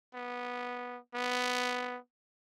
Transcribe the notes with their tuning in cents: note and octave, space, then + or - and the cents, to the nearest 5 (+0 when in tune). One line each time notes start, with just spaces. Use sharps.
B3 -10
B3 +5